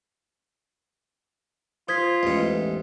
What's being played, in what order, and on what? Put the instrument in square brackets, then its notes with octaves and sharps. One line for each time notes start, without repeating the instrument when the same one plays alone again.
[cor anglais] F4 [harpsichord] C5 [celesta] D#6 G#6 B6
[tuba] A1 [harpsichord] E2 G#2